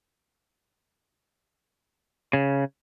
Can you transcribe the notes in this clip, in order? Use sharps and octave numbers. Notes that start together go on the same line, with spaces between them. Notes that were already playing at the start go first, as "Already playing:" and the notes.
C#3